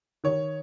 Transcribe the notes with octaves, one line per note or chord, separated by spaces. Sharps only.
D#3 C#5